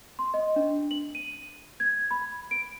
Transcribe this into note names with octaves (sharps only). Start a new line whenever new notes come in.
C6
D#5
D4
F#7
D#7
G#6
B5
D7